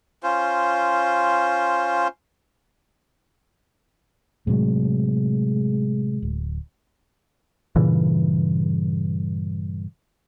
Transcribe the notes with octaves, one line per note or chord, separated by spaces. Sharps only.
C#4 F4 C5
A2 C3 F#3 G#3
D1
G2 A#2 C#3 E3